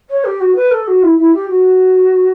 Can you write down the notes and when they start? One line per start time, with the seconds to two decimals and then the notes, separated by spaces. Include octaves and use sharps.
0.09 C#5
0.24 G4
0.40 F#4
0.55 B4
0.71 A4
0.87 F#4
1.02 E4
1.18 E4
1.33 G4
1.48 F#4